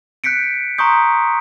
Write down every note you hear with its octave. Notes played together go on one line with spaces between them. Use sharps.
F#6 G6 B6 C#7 D7
A#5 C6 C#6 D#6 G6